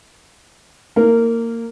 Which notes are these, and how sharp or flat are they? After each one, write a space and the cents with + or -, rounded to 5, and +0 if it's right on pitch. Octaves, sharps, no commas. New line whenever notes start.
A#3 -15 E4 -45 A#4 -20